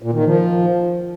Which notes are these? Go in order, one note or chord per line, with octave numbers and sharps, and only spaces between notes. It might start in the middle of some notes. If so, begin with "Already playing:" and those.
A#2
D#3
F3